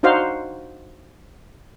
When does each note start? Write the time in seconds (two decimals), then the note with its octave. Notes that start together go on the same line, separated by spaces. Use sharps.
0.03 D4 D#4 F#4 C5 F5